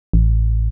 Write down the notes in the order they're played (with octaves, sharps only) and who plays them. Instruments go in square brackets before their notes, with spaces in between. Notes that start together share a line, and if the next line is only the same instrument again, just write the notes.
[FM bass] A1